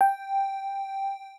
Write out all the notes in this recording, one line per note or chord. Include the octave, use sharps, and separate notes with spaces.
G5